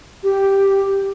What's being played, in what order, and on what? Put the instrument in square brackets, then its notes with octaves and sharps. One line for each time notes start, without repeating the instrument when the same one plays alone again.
[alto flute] G4